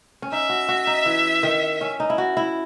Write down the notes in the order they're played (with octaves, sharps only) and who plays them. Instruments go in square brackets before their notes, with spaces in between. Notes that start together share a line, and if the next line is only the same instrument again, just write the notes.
[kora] C#4
[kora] D#4 [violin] E5
[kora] F#4
F#4
D#4
E3
D#3
C#4
D#4
E4
F#4
E4